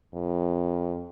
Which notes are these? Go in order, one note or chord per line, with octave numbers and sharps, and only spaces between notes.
F2